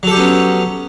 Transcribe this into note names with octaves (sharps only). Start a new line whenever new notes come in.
F#3 B3 C#4 G4 A4